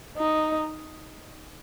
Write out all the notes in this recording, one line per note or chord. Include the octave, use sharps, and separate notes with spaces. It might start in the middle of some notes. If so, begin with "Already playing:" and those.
D#4